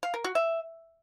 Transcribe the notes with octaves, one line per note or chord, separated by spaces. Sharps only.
F5
A#4
F#4
E5